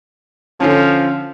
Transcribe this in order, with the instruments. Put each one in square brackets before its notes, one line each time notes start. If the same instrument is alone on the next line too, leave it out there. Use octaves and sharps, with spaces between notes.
[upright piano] D3 C#4 [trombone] F3